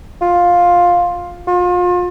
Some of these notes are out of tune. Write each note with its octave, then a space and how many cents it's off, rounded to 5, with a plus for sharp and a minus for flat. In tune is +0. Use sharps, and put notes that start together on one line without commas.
F4 +10
F4 +35